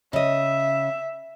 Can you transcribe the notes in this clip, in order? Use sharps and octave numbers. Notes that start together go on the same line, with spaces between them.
C#3 D#5 E5